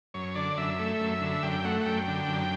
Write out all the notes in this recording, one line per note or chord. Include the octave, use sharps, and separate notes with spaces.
F#2 C#5
D3 D5
F#2 E5
A3
F#2
D3
F#2 G5
A3 F#5
F#5
F#2 G5
D3
F#2